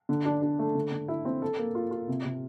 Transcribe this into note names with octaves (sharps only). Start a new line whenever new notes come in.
D3
D4
D4
A3
D3
D3
E4
C4
A4
A#3
F4
F4
C3
C3